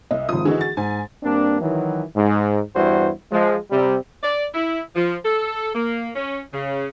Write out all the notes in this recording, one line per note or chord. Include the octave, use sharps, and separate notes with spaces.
C2 D#5
G#1 F3 D#6
D3 E3 D#4 F#4 G#4
A6
G#2 G#5
G2 A#3 C4 D4
D#3 E3 F#3
G#2
E2 G2 G3 E4 F#4 C5
F3 G#3
C3 G3
D5
E4
F3
A4
A#3
C#4
C#3